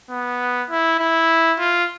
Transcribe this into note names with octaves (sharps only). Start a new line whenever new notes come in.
B3
E4
E4
F4